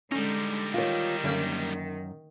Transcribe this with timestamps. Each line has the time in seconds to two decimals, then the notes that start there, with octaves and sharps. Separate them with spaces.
0.12 D3 G3 G#3 C#4 D#4
0.74 D#3 F4 C#5
1.24 F#2 D3 A#3 B6